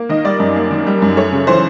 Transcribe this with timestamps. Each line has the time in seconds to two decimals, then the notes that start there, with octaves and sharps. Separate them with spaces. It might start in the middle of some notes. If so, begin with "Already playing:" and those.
Already playing: A#3
0.09 D#3 D#5
0.24 G3 D5
0.40 F#2
0.56 A#3
0.71 D#3
0.86 G3
1.02 F#2
1.17 A3 C#5
1.32 C#3
1.47 E3 C5